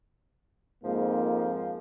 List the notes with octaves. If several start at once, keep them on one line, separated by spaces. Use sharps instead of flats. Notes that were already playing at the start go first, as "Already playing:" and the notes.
F2 G#2 F3 A#3